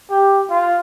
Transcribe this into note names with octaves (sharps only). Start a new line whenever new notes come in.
G4
F4